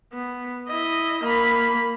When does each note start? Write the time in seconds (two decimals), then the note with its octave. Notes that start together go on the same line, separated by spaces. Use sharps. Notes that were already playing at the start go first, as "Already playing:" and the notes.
0.13 B3
0.69 E4 D#5
1.23 A#3 B5